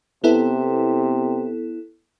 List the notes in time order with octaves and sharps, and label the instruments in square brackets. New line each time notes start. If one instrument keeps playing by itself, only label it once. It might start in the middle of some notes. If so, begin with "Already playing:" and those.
[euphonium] C3 [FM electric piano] B3 E4 A4